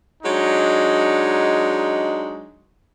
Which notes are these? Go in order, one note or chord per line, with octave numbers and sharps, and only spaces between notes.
F#3 G#3 D4 D#4